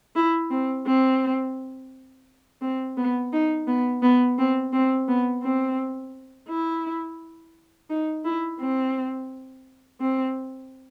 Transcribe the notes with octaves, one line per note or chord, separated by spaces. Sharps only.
E4
C4
C4
C4
B3
D#4
B3
B3
C4
C4
B3
C4
E4
D#4
E4
C4
C4